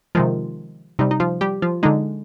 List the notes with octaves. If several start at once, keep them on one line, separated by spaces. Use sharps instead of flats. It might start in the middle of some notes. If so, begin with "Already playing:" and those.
C3 D#3 F3 G#3 F4
C3 G3 D#4
D#4
F3 F4
G3 G4
F3 F4
D3 G#3 D#4